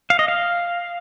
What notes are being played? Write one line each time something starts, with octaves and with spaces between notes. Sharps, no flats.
F5
D#5
F5